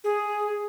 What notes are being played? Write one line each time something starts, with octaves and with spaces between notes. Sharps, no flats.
G#4